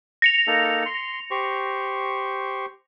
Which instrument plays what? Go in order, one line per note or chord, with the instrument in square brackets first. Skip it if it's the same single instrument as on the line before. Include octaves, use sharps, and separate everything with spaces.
[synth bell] A#6 C#7 F7
[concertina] A#3 D#4 A4
C6
G4 C5 C#6